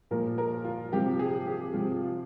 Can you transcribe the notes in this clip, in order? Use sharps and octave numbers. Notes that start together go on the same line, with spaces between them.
A#2 F3 A#4
A#4
F4
C3 F3 G4
G#4
G4
C3 F3 F4
F4